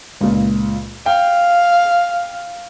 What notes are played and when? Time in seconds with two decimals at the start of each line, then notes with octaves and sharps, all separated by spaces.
0.21 C#2 A#2
1.06 F5 G5